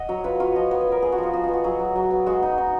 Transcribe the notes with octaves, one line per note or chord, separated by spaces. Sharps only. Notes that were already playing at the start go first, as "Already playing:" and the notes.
Already playing: D#5 F#5
F#3 C#5
F4 B4
F4 C#5
F3 D#5
B3 C#5
B4
F4 A#4
B3 G#4
F#4
F3
F4
F3 F#4
B3 F4
F#4
F#3 G#4
F#3
F#3
B3
G#3 F#4
D#4
D#4